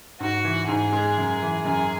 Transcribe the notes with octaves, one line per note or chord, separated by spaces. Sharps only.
G#2 F#4
E3
G#2 G#4
G#3
F#2
E3
F#2 G#4